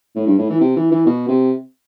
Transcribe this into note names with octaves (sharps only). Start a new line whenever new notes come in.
A2
G2
A2
E3
C3
E3
E3
B2
C3